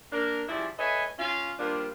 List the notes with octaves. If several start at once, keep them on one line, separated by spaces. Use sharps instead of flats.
A#3 D4 A#4
C#3 F3 G3 E4 G#4 D5
A4 B4 C#5 D#5 E5 G#5
C#4 F4 F5
F3 G3 A#3 D4 F4